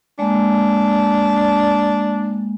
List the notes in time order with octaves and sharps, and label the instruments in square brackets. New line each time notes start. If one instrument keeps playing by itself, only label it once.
[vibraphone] G#3 A#3 [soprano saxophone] D4